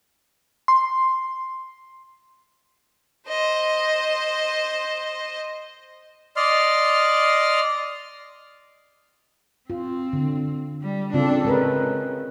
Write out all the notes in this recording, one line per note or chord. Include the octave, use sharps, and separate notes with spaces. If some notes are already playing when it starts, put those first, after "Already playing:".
C6
C5 D#5
D5 D#5 C6 F6
C4 F4
D3
G3
C#3 C4 D4 F4 A4
C#3 G#3 A#4 B4